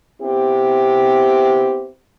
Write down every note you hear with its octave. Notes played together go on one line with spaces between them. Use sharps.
B3 C4 E4 G4